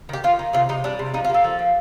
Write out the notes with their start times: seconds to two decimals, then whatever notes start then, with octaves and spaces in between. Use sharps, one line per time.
0.09 D#3 G4
0.24 D#3 F4
0.39 D#3
0.53 C3 F4
0.69 C3 D#4
0.84 G3 D4
0.99 C3
1.14 F3 D#4
1.24 F4
1.29 A#3 A4
1.44 F3
1.59 A#2